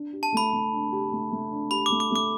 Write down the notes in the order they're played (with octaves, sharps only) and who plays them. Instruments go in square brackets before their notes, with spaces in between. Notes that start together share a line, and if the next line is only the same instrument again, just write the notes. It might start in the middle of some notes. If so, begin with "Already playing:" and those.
Already playing: [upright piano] D4
G4
[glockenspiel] A5
[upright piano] A3 [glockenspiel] B5
[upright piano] A3
D4
G4
A3
A3
D4
[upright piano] G4 [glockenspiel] B5
[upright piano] A3 [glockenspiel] D6
[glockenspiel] D6
[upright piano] A3 [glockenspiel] D6